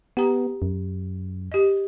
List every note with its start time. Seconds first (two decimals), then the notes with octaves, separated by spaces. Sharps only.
0.17 B3 G4 G5 A#5
0.62 F#2
1.52 G4 D#5